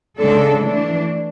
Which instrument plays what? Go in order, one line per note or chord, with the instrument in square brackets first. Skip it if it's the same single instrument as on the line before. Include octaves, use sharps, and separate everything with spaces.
[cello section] C#3 G#3 D4 A4
E3 A3 D4